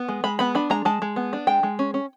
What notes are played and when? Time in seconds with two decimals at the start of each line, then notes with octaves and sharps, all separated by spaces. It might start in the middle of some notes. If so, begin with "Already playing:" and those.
Already playing: B3
0.09 G#3
0.24 G#3 B5
0.39 B3 B5
0.55 D4 B5
0.70 G#3 A#5
0.85 G#3 A5
1.02 G#3
1.16 B3
1.33 D4
1.47 G#3 G5
1.63 G#3
1.79 C#4
1.94 C#4